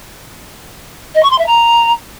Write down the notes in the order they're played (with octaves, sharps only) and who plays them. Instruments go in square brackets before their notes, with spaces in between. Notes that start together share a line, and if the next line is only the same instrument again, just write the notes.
[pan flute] D#5
C#6
C6
E5
A#5